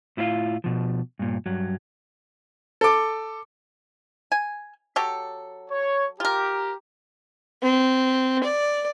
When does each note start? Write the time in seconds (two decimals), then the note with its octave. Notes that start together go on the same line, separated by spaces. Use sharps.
0.17 A2 E4 F4 A#4 F5
0.64 B2 F3
1.19 G2 A#2
1.46 G2 F#3
2.81 A4 D6
4.32 G#5
4.96 F#3 G4 A4
5.71 C#5
6.20 F4 G4 A#4 A#5
7.62 C4
8.44 D5